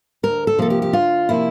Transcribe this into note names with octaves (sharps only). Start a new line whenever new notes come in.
D2 A#4
A4
C3 F3 A#3 A4
G4
G4
D2 F4
C3 F3 A#3 E4